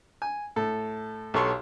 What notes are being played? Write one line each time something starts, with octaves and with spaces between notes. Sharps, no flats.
G#5
A2 A4
B1 G4 A4 C#5 C6 C#6